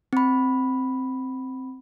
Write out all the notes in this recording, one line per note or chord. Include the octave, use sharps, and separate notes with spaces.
C4 B5